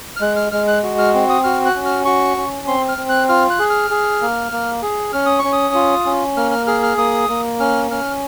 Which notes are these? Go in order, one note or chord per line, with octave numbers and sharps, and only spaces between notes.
F6
G#3 F#6
F6
G#3 F6
F#6
F#4
F6
C4
D#6
F#4 F6
F#6
C#4
F6
F#4 C#6
C#4
C4 C6
F6
C4
F#6
F4 F6
F#6
G#4
F6
G#4
A#3
A#3
G#4
C#4 F6
D#6
C#4 C#6
D#6
F4
C#4
A#3 F6
F6
G#4 F6
F6
A#3 D#6
A#3
C#4 F6
C#4 F6